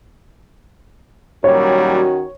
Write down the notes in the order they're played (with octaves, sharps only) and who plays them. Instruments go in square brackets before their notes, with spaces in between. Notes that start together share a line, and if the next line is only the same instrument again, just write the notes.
[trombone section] A#2 F#3 G3 [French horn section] D#3 C#4 F#4 [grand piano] C#5